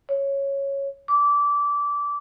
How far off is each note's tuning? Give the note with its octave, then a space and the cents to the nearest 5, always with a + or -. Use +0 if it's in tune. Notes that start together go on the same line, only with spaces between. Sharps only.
C#5 -5
D6 -20